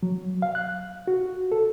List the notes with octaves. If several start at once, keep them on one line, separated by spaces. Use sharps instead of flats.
F#3
F5
F#6
F#4
A4